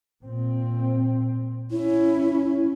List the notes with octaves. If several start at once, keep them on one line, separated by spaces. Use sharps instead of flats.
A#2 C4
C#4 E4